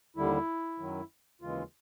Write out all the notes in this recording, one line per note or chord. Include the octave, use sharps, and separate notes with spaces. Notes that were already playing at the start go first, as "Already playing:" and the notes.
D#2 D3 G3 E4
F#2 D#3 F#3
D#2 C#3 E3 G#3 F4